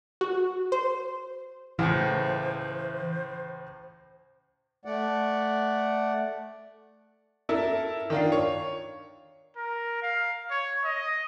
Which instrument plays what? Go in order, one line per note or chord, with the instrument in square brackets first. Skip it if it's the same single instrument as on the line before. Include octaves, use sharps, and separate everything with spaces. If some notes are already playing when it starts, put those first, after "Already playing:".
[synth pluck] F#4
C5
[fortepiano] C#2 A2 [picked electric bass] E3 [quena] C5
[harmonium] A3 D5 F#5
[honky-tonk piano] E4 A4 A#4
D#3 D4 F4
C#5
[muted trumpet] A#4
F5
C#5
D#5